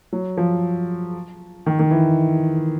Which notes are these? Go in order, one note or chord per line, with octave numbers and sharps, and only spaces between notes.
F#3
F3
D#3
D#3
E3